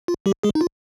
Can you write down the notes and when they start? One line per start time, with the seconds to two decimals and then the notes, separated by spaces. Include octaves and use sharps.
0.08 F4
0.26 G3 G4
0.43 G#3 G#4
0.55 D#4
0.61 F4